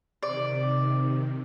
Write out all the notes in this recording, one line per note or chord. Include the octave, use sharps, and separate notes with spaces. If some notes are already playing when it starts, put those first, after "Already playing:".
C3 D#3 D5